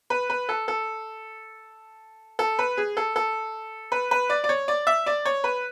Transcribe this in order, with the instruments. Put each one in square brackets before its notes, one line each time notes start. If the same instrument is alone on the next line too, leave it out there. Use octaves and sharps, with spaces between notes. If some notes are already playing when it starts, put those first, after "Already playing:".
[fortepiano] B4
B4
A4
A4
A4
B4
G#4
A4
A4
B4
B4
D5
D5
C#5
D5
E5
D5
C#5
B4